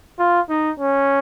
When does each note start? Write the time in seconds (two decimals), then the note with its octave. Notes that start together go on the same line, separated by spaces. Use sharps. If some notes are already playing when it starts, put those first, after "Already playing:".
0.19 F4
0.49 D#4
0.80 C#4